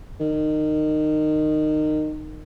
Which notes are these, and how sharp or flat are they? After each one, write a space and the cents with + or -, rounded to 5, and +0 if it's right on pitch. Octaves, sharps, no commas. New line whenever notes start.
D#3 -20